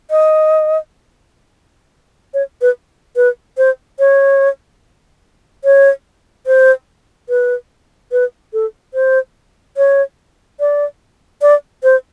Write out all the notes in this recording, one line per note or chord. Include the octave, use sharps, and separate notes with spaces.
D#5
C#5
B4
B4
C5
C#5
C#5
C5
B4
B4
A4
C5
C#5
D5
D5
C5